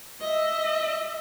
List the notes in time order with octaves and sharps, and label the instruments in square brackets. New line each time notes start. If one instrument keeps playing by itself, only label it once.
[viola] D#5 E5